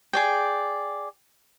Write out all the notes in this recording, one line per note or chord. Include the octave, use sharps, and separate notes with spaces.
G#4 D5 G5